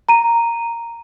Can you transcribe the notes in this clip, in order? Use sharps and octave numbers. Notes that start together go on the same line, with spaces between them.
A#5 D#7